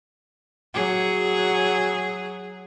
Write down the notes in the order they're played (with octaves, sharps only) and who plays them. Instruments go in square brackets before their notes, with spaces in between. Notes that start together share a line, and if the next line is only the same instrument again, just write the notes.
[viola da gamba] F#3 G#4